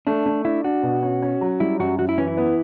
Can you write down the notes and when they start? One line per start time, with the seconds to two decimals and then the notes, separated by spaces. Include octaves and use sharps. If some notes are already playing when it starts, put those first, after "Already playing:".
0.07 A3 D4
0.26 A3
0.45 D4 E4
0.64 D4 F#4
0.83 B2
1.03 C#4
1.22 C#4
1.41 F#3
1.60 G3 E4
1.80 F#2 F#4
1.99 F#2 F#4
2.09 E4
2.18 E3 C#4
2.27 E4
2.37 B3